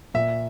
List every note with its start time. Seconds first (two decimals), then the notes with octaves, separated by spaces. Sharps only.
0.14 A#2 E5